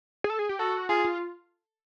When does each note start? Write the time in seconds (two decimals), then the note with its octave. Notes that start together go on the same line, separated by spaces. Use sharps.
0.24 G#4
0.30 A4
0.39 G#4
0.49 G4
0.59 F#4 A4
0.89 F4 G#4
1.04 F4